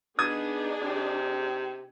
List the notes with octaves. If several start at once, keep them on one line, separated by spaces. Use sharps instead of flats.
B3 D4 D#4 G#4 D#6 G#6
C3